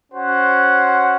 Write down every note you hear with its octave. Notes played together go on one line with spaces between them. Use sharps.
C#4 F#4 C5 F#5